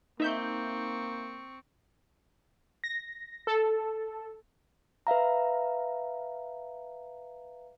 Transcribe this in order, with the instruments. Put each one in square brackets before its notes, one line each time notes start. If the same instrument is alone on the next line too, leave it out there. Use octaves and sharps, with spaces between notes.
[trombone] A#3 [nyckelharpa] C4 C#6 [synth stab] D#4 E5 G6
[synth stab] A#6
A4
[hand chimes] B4 E5 F5 A#5